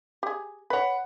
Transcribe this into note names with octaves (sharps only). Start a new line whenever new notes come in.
G4 G#4
B4 C#5 F#5 B5